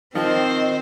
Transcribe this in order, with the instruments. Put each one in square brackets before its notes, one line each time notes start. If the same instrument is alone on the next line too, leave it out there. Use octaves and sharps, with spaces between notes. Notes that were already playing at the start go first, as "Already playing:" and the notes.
[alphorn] D#3 [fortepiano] F3 [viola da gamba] C4 C5 [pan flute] D#5